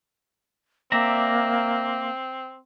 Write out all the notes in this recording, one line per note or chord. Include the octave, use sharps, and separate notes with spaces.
A#3 C4 D5 E5 A#5